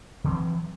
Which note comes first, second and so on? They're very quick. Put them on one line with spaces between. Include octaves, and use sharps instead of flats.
D3 C4 F#3 E3